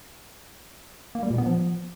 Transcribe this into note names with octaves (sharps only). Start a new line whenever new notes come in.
A#3
G3
A#2
B3
F3